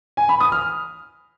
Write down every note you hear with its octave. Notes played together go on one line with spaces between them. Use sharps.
G#5
B5
D#6
F6